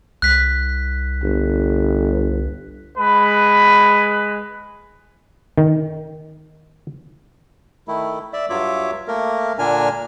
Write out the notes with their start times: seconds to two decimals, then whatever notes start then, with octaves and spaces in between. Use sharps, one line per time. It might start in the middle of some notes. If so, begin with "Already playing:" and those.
0.22 C2 F#6 B6
1.23 G1
2.97 G#3 B4 B5
5.58 D#3
7.88 D#3 A3 E4
8.33 D5 E5
8.50 G2 F#3 F4 C#5 E5 D6
9.08 A3 A#3 A#4
9.59 A#2 D3 D4 A#4 G#5 F6